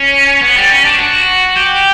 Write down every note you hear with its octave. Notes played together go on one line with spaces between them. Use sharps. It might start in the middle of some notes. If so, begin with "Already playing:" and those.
Already playing: C#4
B3
G3
C#4
D4
F#4
G4